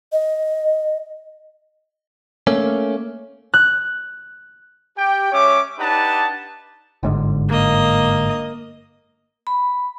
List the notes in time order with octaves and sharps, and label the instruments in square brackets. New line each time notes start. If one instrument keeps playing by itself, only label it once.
[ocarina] D#5
[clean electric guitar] A3 A#3 C#4
[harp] F#6
[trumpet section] G4 G5
G#3 C#4 C#5 E5 D6
D4 D#4 G4 B4 F#5 A5
[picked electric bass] G1 G#2 D3
[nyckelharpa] A#3 D#5
[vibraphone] B5